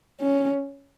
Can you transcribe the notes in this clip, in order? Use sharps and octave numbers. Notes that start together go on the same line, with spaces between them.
C#4